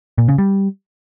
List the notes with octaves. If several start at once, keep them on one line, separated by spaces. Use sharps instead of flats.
A#2
C#3
G3